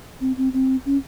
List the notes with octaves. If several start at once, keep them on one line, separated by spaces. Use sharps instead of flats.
C4
C4
C4
C#4